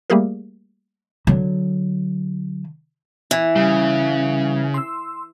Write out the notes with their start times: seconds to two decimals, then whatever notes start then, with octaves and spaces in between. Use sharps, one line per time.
0.10 G3 A3 A#3 G4 G#4 A#4
1.27 D3 F#3
3.31 E3
3.56 C#3 G3
4.74 C6 E6